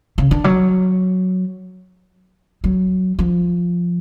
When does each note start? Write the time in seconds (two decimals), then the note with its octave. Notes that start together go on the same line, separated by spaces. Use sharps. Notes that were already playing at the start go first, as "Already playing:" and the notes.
0.18 C#3
0.31 D3
0.44 F#3
2.64 F#3
3.19 F3